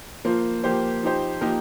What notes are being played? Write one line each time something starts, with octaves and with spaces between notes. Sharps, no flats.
F3 A#3 F4 C5
F3 A#3 G4 C5
F3 D#4 G4 C5
F3 A#3 D#4 G4 A#4